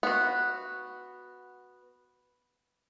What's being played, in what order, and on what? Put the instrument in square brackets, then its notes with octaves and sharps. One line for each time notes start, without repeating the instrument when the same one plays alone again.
[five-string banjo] B3 F#4